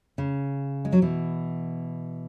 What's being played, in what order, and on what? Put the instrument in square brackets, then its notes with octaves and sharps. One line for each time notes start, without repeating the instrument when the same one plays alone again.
[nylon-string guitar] C#3
G#3
F#3
B2 E3